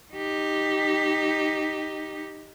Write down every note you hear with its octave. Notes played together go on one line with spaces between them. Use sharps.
D#4 G4